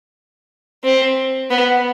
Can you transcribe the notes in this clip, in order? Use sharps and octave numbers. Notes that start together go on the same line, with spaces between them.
C4
B3